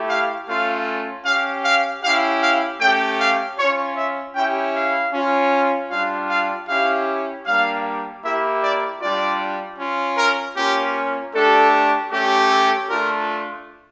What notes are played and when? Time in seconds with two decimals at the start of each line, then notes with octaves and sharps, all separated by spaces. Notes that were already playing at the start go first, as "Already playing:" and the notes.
Already playing: A3 E4 G4
0.09 F5
0.48 A3 C#4 F4 F5
1.25 C#4 G4 F5
1.64 F5
2.03 C#4 E4 G4 F5
2.42 F5
2.80 A3 C#4 G4 G5
3.19 F5
3.58 C#4 F4 C#5
3.97 E5
4.35 C#4 E4 G4 G5
4.74 F5
5.13 C#4 F4
5.91 G3 D4 F4 F5
6.29 F5
6.68 C#4 E4 G4 F5
7.46 G3 A#3 D4 F5
8.23 A#3 E4 G4 E5
8.63 D5
9.01 G3 D4 F4 D5
9.78 C#4 F4
10.17 A#4
10.56 A#3 C#4 F4 G4
11.34 A3 D4 G4 A4
12.11 A3 C#4 G4
12.50 A4
12.89 A3 D4 F4 A#4